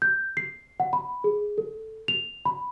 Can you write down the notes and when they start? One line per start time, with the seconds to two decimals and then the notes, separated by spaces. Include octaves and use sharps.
0.02 G6
0.37 C7
0.80 F#5
0.93 B5
1.24 G#4
1.58 A4
2.08 F7
2.45 B5